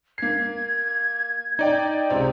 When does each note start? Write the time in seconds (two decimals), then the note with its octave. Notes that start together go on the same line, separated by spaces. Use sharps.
0.18 A#3 G#6 C7
1.59 D#4 D5 G5
2.10 C#2 C3 C5